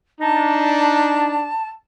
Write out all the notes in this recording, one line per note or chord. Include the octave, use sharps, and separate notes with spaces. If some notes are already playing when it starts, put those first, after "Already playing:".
D4 D#4 A5